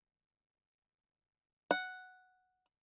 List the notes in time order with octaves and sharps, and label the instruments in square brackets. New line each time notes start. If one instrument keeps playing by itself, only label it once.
[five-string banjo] F#5